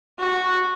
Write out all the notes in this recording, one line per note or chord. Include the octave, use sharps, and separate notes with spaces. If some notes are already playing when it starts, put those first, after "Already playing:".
F#4